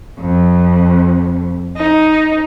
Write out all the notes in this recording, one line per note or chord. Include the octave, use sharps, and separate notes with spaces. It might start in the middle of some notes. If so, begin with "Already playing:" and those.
F2
D#4